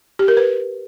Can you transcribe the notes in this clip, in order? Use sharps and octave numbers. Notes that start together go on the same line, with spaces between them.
G4
A#4
B4